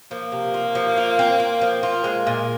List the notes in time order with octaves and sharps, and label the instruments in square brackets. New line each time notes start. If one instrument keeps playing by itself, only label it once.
[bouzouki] F3 [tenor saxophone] A#3
[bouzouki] C3
F4
F3
F4
C4
C4
F3
[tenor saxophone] A#3 [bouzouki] F4
[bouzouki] G#3
A#2